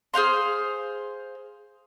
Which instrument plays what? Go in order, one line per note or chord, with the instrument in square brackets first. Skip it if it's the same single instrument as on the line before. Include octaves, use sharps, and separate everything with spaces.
[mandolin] G#4 C5 F5 C6